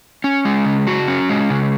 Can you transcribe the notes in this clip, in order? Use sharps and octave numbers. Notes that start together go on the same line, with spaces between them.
C#4
G#3
C#3
F#4
C#4
G#3
C#3